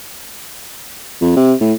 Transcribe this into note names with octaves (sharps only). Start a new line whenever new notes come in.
F2
C3
A2